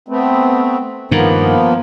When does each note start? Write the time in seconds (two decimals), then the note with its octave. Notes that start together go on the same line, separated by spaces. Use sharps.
0.08 A3 B3 C4
1.11 G2 D#3 F3 A#3 B3